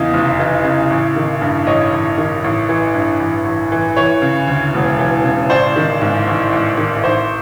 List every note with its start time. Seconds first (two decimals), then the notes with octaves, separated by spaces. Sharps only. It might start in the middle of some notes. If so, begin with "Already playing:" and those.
Already playing: E2 C#3 E3 D#5 F5
0.14 F1
0.40 E3
0.64 C#3
0.90 A1
1.16 D#3
1.42 G2
1.67 A1 C#5 D#5
1.92 A1
2.18 D#3
2.44 A1
2.69 E3
2.94 G2
3.20 A1
3.46 A1
3.72 E3
3.97 E3 C#5
4.22 C#3
4.48 D2
4.74 E1
4.99 E3
5.24 C#3
5.50 A1 C5 D5
5.76 D#3
6.02 G#2
6.27 A1
6.52 A1
6.78 D#3
7.03 A1 C5